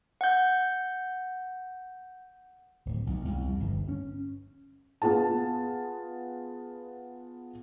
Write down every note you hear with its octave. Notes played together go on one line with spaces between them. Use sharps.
F#5 G6
D1
B1
C2
F2
G1
C#4
B3 F4 G#4 A5